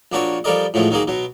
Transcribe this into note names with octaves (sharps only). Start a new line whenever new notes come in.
A#1 A#3 D4 F#4 C#5
F3 G3 A4 A#4 D5 D#5
A2 F3 F#3 G#3
D#3 F#3 A#3 G#4
B2 F#3